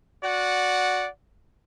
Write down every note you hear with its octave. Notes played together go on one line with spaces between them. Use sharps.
F#4 D5 F#5